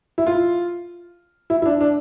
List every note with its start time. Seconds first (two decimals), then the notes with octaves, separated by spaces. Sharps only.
0.18 E4
0.27 F4
1.50 E4
1.62 E4
1.66 D4
1.81 D4